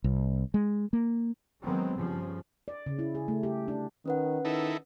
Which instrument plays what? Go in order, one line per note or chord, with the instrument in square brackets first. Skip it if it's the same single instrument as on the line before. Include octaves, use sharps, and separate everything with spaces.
[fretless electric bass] C2
G#3
A#3
[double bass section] D#3 F#3 G#3 B3 C4
G2 C#3 F3
[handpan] D5
C#3
E4
G#4
A3
G4
D4
[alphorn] D#3 [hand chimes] C#4 B4 F#5
[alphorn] D#3 [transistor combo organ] D#4 E4 A4